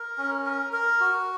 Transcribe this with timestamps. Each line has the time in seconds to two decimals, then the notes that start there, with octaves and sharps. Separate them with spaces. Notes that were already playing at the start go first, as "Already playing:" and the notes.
Already playing: A#4
0.18 C#4
0.46 A#4
0.73 A#4
1.01 F#4